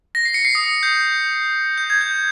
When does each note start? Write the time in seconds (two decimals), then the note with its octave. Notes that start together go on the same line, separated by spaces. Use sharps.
0.15 A#6
0.25 C7
0.34 C#7
0.45 C7
0.55 D#6
0.83 G6
1.78 G6
1.90 G#6
2.01 G6